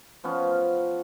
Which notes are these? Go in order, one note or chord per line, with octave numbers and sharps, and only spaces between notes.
F3 B3 C#4